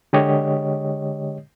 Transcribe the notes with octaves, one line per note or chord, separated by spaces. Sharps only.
D3 G#3 G4 C#5 D#5